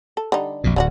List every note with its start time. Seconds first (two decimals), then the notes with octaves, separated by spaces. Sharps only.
0.17 A4
0.32 D3 G3 D#4
0.64 A#1 F2 B2
0.76 D1 D3 D4 F#4